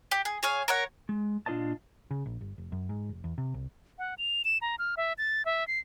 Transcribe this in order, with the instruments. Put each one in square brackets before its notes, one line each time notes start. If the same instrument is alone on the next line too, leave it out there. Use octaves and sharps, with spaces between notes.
[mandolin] G4
G#4
G#4 C#5 F5
A#4 C#5 F#5
[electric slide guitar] G#3
A#2 D4 F4 C5 D#5 A5
[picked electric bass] C#3
A#1
G1
F1
F#2
G#2
F1
E2
C3
C2
[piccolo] F#5
F7
E7
A#5
F6
E5
A6
E5
C7